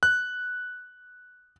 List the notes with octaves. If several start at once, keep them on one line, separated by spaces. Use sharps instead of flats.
F#6